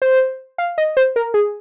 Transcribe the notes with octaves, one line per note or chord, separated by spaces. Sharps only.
C5
F5
D#5
C5
A#4
G#4